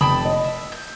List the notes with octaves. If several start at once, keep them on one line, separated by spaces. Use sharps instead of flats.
F1 G5 A5 B5 D#6
D#5
E5
G6